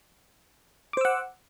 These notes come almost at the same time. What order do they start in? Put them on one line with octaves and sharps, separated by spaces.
D6 C5 E6 F#5